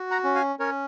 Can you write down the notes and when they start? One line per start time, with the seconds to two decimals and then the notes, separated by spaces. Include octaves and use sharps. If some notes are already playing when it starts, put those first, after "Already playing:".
Already playing: F#4
0.11 F#5 A#5
0.24 C#4
0.35 F5 G#5
0.59 C#4 A#4 C#5